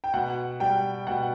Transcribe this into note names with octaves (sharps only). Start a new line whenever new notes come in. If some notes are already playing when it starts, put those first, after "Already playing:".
G5
B2 F#5
G3 G5
B2 F#5